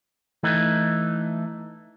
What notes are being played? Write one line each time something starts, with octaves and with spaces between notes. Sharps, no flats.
E3 A3 D#4